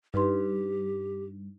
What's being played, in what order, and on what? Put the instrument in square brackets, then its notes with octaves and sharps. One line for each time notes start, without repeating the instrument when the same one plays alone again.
[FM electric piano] G2 [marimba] D#4 B4 C6 [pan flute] G4